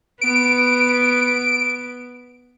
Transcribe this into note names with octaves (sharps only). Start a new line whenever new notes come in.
B3 D7